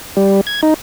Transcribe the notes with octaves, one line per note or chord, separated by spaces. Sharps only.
G3
G#6
D#4